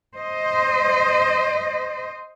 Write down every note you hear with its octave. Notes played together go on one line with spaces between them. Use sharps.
C5 D#5